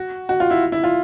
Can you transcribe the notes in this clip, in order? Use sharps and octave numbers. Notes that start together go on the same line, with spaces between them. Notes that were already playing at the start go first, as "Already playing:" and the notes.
Already playing: F#4
F#4
F4
E4
E4
F4